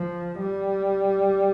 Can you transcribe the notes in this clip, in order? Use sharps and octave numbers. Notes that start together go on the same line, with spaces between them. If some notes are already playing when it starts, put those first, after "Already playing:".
Already playing: F3
G3